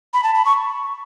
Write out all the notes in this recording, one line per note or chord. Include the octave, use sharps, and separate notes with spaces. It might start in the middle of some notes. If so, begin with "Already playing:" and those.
B5
A5
B5
C#6